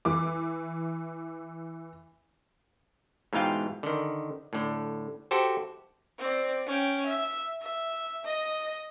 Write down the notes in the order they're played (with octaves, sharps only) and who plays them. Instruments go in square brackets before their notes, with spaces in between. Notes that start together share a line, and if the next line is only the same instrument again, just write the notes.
[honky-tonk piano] E3 D6
[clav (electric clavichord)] G#2 B2 E3 F4 F5 G5
D3 D#3
A2 D3
F#4 G4 A4 C5
[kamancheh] C4 D5
C#4 G5
E5
E5
D#5